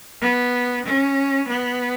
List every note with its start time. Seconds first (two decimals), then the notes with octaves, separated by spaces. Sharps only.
0.21 B3
0.86 C#4
1.49 B3